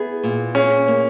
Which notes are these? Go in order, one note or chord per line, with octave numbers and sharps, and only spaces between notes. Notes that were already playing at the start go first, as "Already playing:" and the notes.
Already playing: B3 E4 G#4
A#2
C#4 G#4
A#3